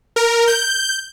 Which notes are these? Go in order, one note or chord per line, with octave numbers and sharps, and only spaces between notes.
A#4
G6